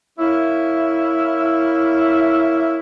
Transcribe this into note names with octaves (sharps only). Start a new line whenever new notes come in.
A#3 C#4 E4